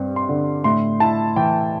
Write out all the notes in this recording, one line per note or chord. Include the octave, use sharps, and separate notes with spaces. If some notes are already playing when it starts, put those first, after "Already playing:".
Already playing: G2 G3 C4
C6
D3
A2 C6
E4 A5
E3 G5